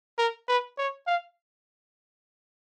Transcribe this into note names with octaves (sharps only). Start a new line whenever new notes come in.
A#4
B4
C#5
F5